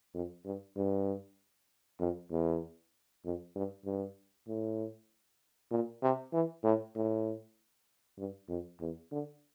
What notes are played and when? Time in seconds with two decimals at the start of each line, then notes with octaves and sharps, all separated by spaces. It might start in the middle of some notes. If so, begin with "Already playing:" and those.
0.14 F2
0.45 G2
0.77 G2
2.00 F2
2.31 E2
3.25 F2
3.56 G2
3.85 G2
4.48 A2
5.71 A#2
6.02 C3
6.33 E3
6.64 A2
6.95 A2
8.18 G2
8.49 F2
8.80 E2
9.12 D3